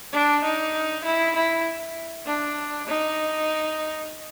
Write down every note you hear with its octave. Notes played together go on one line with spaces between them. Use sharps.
D4
D#4
E4
E4
D4
D#4